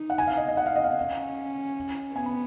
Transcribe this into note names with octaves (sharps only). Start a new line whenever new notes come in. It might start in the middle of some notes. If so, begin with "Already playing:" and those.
Already playing: D#4
F#5
G#5
F5
D#5
D#5
F#5
F5
D#5
F5
C#4
B3 G#5
B5